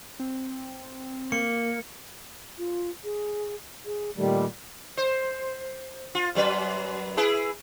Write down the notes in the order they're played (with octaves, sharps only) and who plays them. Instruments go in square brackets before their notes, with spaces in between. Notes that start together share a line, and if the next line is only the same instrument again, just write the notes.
[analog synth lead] C4
[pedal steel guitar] A#3 [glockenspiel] C#7
[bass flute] F4
G#4
G#4
[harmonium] A#2 D#3 G3 [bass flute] A3
[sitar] C5
F4
F#2 F#3 B4
E4 G#4 B4